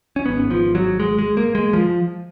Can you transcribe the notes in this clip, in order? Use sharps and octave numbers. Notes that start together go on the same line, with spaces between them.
C#4
G#1 G#2 B3
F3
F#3
G#3
G#3
A#3
G#3
F3